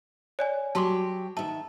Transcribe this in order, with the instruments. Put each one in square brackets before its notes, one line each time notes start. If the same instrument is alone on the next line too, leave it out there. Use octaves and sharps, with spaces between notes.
[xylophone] C#5 D5 G#5
[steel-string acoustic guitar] F#3 G4 [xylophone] A5 C6 D6
[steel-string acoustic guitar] D#3 E5 [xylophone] A5